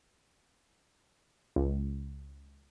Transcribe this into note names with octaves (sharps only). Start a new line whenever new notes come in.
C#2